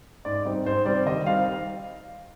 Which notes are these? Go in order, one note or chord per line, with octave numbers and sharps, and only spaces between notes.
G#2 D5
G3 C4 D#4
G#2 C5
G3 C4 D5
D#3 D#5
G3 C4 D#4 F5